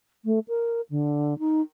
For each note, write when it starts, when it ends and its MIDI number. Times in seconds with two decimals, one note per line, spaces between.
0.25 0.39 57
0.48 0.81 70
0.90 1.37 50
1.39 1.61 63